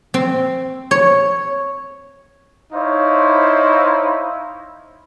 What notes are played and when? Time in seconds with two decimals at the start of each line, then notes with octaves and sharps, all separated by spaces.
0.14 C4
0.91 C#5
2.73 D#4 E4 C5 C#5 F5